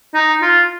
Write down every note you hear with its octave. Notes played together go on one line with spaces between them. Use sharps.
D#4
F4